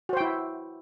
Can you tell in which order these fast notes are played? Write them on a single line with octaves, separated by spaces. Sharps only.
F#4 C5 G5 E4